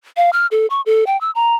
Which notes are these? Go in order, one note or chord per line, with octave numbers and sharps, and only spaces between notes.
F5
F6
A4
C#6
A4
G5
E6
A#5